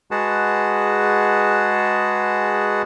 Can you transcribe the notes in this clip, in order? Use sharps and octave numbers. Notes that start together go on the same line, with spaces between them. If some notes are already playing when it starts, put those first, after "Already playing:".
G#3 F#4 G#4 B4 F#5 A5